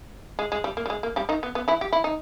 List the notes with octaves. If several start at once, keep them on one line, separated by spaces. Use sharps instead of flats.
G#3
G#3
G3
A#3
G3
G#3
A#3
G3 G4
D#3 D#4
B3
B3
E3 E4
G4
E4
D#4